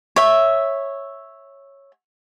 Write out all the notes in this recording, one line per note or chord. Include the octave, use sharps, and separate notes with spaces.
C#5 E5